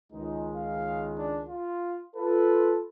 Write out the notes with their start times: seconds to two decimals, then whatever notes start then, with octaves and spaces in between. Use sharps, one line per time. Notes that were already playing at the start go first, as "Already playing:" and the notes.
0.12 C#2 D#3 G#3 D#4
0.55 F5
1.18 D4
1.49 F4
2.16 F4 A4 B4